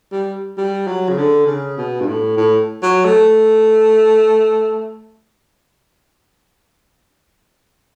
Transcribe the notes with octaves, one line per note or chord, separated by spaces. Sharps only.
G3
G3
F#3
C#3
D3
C#3
B2
G2
A2
A2
F#3
A3